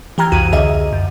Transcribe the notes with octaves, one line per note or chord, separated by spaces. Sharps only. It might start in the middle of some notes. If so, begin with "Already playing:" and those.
E3 G4 G5 A#5 F6 G#6
C2 F2 F#4 D#7
C#2 D3 G#4 D#5 E5
F#2